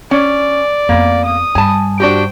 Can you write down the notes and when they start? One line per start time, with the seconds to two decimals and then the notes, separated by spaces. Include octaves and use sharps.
0.11 C#4 D5
0.89 F2 A#3 B3
1.25 D#6
1.55 G2 G#5 A5
2.00 D4 F#4 G4 C5 G5